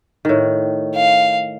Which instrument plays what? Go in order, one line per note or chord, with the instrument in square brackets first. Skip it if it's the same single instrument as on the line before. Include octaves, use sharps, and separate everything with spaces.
[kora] A2 D#3
[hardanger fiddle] F5